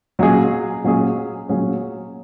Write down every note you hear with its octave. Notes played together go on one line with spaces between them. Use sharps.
A#2 F#3 C#4 G#4
A#2 F#3 C#4 G#4
A#2 F#3 C#4 G#4